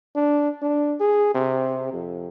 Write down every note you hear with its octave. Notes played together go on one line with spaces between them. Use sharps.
D4
D4
G#4
C3
F2